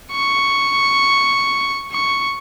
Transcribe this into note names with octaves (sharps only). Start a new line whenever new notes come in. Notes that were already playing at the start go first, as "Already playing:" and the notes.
C#6
C#6